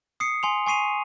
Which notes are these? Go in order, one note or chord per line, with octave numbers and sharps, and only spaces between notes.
D#6 C7 C#7
G#5 C6 F7
G#5 C#6 C7 D#7 F7